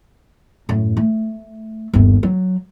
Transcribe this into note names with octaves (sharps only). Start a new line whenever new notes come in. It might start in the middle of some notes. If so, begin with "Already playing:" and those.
F#2 A2
A3
G1 D#2
F#3